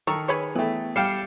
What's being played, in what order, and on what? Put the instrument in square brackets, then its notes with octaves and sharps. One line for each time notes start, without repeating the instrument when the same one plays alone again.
[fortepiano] D#3 [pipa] A4 A#5 C#6
[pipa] G#4 B4 C#5
[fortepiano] E3 A3 [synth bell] B3 G5
[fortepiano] G3 F5 G5 [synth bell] C7 C#7 E7